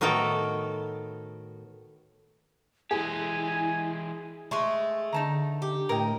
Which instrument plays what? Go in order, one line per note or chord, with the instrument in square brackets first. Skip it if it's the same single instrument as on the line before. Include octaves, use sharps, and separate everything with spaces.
[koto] A2 D#3 B3 F#4 A4 G5
[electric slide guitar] E3 G#3 G4 [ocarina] E4 [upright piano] G#4 [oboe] G#5
[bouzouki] G#3 A3 [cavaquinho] C6 C#6
[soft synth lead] D3 [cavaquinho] D#4 A5 A#5
[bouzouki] G4
[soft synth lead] A2 [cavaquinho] A#4 D#5 G5